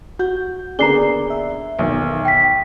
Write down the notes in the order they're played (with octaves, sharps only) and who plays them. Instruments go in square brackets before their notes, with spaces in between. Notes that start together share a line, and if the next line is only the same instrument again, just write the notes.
[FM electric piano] F#4 [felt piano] G6
[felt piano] D3 A#3 B3 [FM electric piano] G#4 D5 [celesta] A#5 C7 G7
[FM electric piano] E5
[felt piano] B1 E2 D#3
[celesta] G5 B6